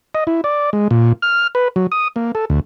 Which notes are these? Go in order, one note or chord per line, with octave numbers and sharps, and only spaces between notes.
D#5
E4
D5
G#3
A#2
F6
B4
F#3
D#6
A#3
A4
D2